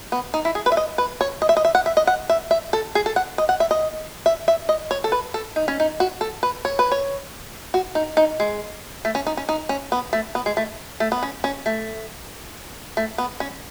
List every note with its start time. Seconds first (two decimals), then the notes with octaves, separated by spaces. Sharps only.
0.12 B3
0.34 D#4
0.45 E4
0.55 G#4
0.66 B4
0.72 E5
0.77 D#5
0.98 B4
1.21 C#5
1.42 D#5
1.49 E5
1.57 D#5
1.65 E5
1.75 F#5
1.86 E5
1.97 D#5
2.07 F#5
2.30 E5
2.51 E5
2.73 A4
2.95 G#4
3.06 A4
3.16 F#5
3.38 D#5
3.49 F#5
3.60 E5
3.71 D#5
4.26 E5
4.48 E5
4.69 D#5
4.91 C#5
5.04 A4
5.12 B4
5.34 A4
5.56 D#4
5.68 C#4
5.80 D#4
6.00 F#4
6.21 A4
6.43 B4
6.65 C#5
6.79 B4
6.92 C#5
7.74 F#4
7.95 D#4
8.17 D#4
8.40 G#3
9.05 A3
9.15 C#4
9.27 D#4
9.37 C#4
9.49 D#4
9.69 C#4
9.92 B3
10.13 A3
10.35 B3
10.46 G#3
10.57 A3
11.00 A3
11.12 B3
11.23 C#4
11.44 C#4
11.66 A3
12.97 A3
13.18 B3
13.40 C#4